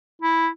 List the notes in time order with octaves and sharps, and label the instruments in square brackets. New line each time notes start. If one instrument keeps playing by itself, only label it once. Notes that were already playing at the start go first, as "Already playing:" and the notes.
[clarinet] E4